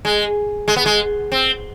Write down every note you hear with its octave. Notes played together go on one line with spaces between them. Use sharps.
G#3
G#3
B3
G#3
C4